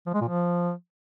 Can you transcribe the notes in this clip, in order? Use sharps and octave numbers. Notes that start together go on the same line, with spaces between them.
F3
G#3
A#2
F3